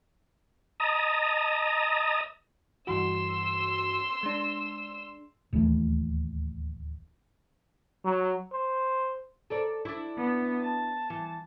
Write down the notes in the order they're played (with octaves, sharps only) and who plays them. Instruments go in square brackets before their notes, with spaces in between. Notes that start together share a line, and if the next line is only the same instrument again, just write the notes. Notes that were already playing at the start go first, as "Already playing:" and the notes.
[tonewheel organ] D#5 A5 A#5 D#6
[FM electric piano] G2 E3 F#4 [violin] C6 E6
[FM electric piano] G#3 D4
[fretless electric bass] D1 D#2 E3 A3
[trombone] F#3
C5
[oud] A4 A#4 D5
D4 E4
[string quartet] B3
A5
[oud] E3